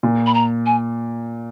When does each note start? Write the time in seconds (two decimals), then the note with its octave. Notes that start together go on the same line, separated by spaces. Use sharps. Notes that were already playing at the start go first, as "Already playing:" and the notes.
0.03 A#2
0.26 B5
0.34 A#5
0.66 G#5